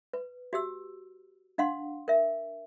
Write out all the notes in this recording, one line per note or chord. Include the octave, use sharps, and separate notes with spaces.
B4
F#4 G4 E6
D4 F5 F#5 C6
A#4 E5